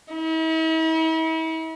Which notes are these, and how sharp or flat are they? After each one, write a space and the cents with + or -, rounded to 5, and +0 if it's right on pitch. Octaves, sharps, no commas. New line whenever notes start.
E4 -45